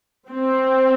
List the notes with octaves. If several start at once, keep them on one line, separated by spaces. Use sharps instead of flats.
C4